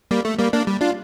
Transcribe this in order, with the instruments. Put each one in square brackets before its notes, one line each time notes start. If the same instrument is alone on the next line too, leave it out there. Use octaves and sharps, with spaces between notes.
[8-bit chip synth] G3 A#3
A3
G3 A#3
A#3 D4
G3
D4 F4